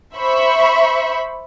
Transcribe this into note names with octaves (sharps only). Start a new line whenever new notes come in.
C5 E5 B5 C#6